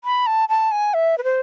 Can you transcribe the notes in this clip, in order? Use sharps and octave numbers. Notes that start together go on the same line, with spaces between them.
B5
A5
A5
G#5
E5
B4
C5